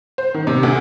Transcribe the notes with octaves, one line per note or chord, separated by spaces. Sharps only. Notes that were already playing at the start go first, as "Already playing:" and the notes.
C5
D#3
C3
D2